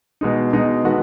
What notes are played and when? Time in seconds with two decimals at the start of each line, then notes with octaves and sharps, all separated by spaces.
0.21 B2 G#3 D#4
0.53 B2 G#3 D#4
0.84 D#3 G#3 B3 F#4 A4